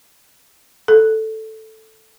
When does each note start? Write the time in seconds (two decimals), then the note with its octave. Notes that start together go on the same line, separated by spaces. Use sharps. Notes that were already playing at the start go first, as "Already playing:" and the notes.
0.88 A4